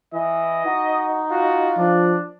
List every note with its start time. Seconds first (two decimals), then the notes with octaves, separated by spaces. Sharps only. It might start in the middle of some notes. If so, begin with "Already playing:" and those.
0.13 E3 D#5
0.66 D#4 F#4
1.30 F4 F#4
1.78 F3 D4